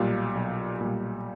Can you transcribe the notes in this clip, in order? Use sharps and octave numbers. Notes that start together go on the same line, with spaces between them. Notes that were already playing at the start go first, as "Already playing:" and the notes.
Already playing: B1 A#2 G3 F5
B1
A#2 G3